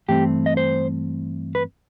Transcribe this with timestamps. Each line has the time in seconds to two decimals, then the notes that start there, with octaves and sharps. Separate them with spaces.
0.08 G2 E3 A3 C4 G4
0.46 D#5
0.57 C5
1.55 B4